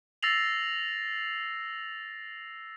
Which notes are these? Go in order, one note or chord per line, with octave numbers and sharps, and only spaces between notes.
E6 A6 A#6 C7 F7 F#7